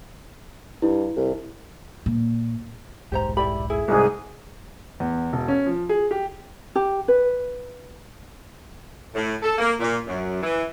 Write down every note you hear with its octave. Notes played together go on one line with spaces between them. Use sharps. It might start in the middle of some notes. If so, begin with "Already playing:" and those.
G2 E4
C2
A#2
D#1 B1 G#2 G4 C5 A#5
E4 G4 D5 B5
E4 G#4
C2 G#2 G#4
E2
E1
C#4
F3
G#4
G4
G4
B4
A2
A4
A#3
A#2
F#2
E3